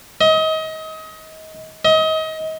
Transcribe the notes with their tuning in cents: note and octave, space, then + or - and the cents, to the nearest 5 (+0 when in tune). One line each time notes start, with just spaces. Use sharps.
D#5 +30
D#5 +30